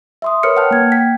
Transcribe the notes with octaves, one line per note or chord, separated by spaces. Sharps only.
E5 C6 D#6
A#4 B4 C#5 F6 C#7
F#5 G5 A5 F6
A#3 G#6
G5 B6